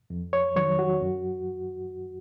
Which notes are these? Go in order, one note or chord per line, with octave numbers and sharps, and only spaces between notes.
F2
C#5
D#3 F#3 C#5
F#4
F#2